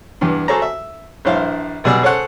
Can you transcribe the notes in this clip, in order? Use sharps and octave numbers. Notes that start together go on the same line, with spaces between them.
E2 G2
F#4 G#4 A4 C5 A5 A#5
E5
A#1 G2 E4 C5 F5
B1 B2 G3 G#4 D5 E6
G#4 A4 C5 C#5 F#5